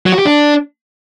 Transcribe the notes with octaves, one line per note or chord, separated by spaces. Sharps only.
F#3
F#4
G4
D4